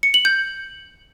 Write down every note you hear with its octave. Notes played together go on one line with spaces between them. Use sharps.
C#7
F#7
G6